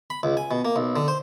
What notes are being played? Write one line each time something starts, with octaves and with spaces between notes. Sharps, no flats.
B5
C#2
G#5
B2
A#3
B1
D3
C5